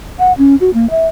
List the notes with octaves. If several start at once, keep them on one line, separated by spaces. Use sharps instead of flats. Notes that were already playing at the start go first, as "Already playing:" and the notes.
F#5
C#4
F#4
A#3
E5